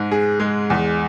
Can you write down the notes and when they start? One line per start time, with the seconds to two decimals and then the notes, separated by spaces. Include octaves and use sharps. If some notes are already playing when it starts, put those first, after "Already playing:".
Already playing: G#2 G#3
0.11 G#4
0.40 G#3
0.70 E2